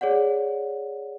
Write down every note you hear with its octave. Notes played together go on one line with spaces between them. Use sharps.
G#4 C#5 D5 F#5